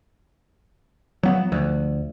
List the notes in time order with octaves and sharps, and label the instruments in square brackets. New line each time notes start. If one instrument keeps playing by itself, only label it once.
[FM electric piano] F3 [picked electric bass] F#3 B3
[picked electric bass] D2